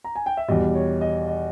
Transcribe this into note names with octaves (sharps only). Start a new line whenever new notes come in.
A#5
G#5
G5
E5
E2 B2 G3 D#5
C#5
D#5
D#5